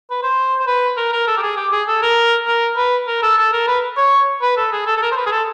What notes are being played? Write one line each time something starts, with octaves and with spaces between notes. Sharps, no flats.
B4
C5
C5
B4
A#4
A#4
A4
G4
G#4
G4
G#4
A4
A#4
A#4
B4
A#4
A4
A4
A#4
B4
C#5
B4
A4
G#4
A4
A4
A#4
C5
B4
G#4
A4